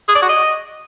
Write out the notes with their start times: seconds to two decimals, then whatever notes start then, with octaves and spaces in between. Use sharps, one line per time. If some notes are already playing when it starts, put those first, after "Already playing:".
0.09 G#4
0.15 D5
0.22 F#4
0.29 D#5